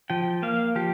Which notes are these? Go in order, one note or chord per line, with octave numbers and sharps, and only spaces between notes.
F3 G5
A#3 F5
F3 G4